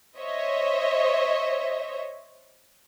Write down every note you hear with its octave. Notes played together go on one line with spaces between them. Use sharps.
C5 C#5 D#5 E5